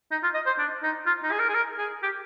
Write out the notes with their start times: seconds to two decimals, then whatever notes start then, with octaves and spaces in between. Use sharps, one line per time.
0.11 D#4
0.23 F4
0.34 D#5
0.46 C5
0.58 D4
0.83 D#4
1.06 F4
1.23 D#4
1.31 G#4
1.39 A#4
1.49 G#4
1.55 A#4
1.78 G#4
2.03 G4